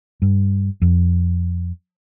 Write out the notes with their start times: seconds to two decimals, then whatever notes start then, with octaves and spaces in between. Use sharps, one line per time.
0.22 G2
0.82 F2